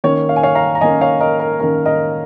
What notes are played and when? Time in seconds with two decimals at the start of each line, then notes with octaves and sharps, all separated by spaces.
0.04 D#3 A#3 C#4 C#5
0.29 F5
0.36 G#5
0.43 C#5 F5
0.55 F5 A#5
0.75 A#5
0.81 D#3 A#3 C#4 D#5 G#5
1.01 C#5 F5
1.20 A#4 D#5
1.40 A#4
1.59 D#3 A#3 C#4 A#4
1.86 A#4 D#5